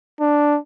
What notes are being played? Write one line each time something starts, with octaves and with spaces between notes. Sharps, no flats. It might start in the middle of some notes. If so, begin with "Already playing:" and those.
D4